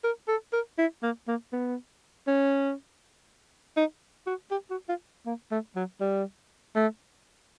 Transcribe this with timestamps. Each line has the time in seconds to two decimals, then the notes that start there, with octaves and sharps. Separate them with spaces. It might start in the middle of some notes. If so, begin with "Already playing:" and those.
0.04 A#4
0.28 A4
0.53 A#4
0.78 E4
1.03 A#3
1.28 A#3
1.53 B3
2.27 C#4
3.77 D#4
4.27 F#4
4.51 G4
4.70 F#4
4.89 F4
5.26 A#3
5.51 A3
5.76 F#3
6.01 G3
6.76 A3